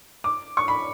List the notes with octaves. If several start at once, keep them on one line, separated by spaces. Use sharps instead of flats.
D6
C#6
B5